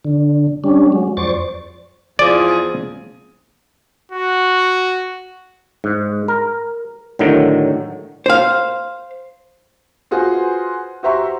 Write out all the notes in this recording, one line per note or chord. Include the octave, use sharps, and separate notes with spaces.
D3
G3 C#4 D4
F#3 G#3
F2 C5 D5 C#6 A6
E2 F3 G#4 D5
F#4
G#2
A#4
A2 D3 D#3 F#3
C5 F5
F4 F#4 G#4 B4 C5
F#4 G4 C5 E5 A#5 C#6